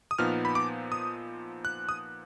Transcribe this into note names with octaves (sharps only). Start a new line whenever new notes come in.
D#6
A#2 F3 B3 D#4 F6
B5
D6
D#6
F#6
D#6